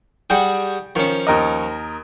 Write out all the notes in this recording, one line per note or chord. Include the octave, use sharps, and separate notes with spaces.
G3 F#4 G#4 G5
D#3 F3 C#4
D#2 A#4 D#5